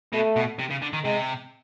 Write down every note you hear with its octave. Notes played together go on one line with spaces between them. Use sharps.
B2 A3
B2
C3
C#3
D3
D#3
C3 G#3